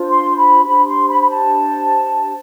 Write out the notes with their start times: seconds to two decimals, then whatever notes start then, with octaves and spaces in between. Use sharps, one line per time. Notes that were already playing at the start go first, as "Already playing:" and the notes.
Already playing: D4 F4 C5
0.09 C6
0.37 B5
0.65 D4 G4 C5 B5
0.87 C6
1.08 B5
1.22 B5
1.30 A5